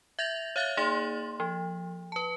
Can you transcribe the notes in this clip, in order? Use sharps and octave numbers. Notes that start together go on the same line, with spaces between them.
E5 G6 A6 A#6 F7
C#5 E5 F5 F#6 A6
A#3 D#4 G#4 C6 A6 F#7
F3
B4 A5